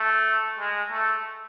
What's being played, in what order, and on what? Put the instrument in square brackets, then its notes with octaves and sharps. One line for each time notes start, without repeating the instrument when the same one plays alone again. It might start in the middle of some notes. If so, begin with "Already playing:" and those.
Already playing: [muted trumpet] A3
G#3
A3